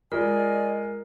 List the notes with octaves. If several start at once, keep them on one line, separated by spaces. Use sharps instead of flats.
G#3 F4 A#4 D5 D#5 G#5